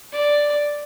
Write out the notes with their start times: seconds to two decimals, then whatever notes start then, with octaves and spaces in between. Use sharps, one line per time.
0.13 D5